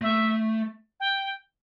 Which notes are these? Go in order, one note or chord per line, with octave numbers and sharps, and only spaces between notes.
A3 E5
G5